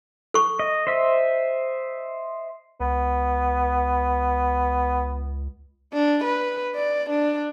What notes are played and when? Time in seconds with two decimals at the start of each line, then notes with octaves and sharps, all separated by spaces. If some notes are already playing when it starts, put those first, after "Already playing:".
0.34 A4 C#6
0.59 D#5
0.87 C5 D#5 E5
2.80 C#2 B3
5.93 D4
6.24 B4
6.75 D5
7.10 D4